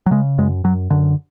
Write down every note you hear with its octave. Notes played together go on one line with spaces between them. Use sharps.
F#3
C#3 G#3
F#2 G#3
F#2 F#3
F#2 D3